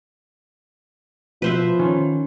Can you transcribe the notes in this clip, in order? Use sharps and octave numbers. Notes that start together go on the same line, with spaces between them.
B2 F3 B4 C5 E5
D#3 C#4